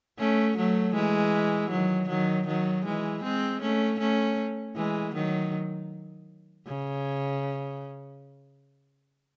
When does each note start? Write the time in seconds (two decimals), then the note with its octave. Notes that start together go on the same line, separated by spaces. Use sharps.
0.19 A3 C#4
0.57 F#3 A3
0.94 E3 G#3
1.71 D#3 F#3
2.09 D#3 F#3
2.47 D#3 F#3
2.85 E3 G#3
3.23 G#3 C4
3.62 A3 C#4
3.99 A3 C#4
4.76 E3 G#3
5.14 D#3 F#3
6.67 C#3